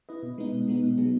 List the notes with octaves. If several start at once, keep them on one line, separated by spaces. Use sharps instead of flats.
E4 B4 D#5
B2
G#3 B3 D#4
B2
G#3 B3 D#4
B2
F#3 B3 D#4 G#4